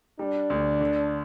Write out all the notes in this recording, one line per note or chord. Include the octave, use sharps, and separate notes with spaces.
G3 D4
D2
D3